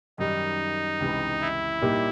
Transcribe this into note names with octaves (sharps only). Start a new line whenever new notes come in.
F#2 D#3 G3 D#4
C#2 C3 E3
E4
A#2 G3 A#3 D#4 G4